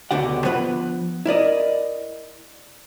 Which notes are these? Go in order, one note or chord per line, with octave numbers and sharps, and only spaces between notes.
C#2 B2 D3 G4 F#5
F3 B3 B4 B5
E4 A#4 D5 D#5